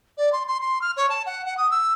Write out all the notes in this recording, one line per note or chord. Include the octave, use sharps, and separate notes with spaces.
D5
C6
C6
C6
F6
C#5
A5
F#5
F#5
D#6
E6